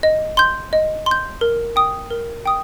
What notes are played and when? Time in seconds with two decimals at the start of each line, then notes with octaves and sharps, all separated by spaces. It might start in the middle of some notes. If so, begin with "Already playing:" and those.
0.03 D#5
0.37 C6 G6
0.73 D#5
1.06 C6
1.11 G6
1.41 A#4
1.76 G5 D#6
2.10 A#4
2.46 G5 D#6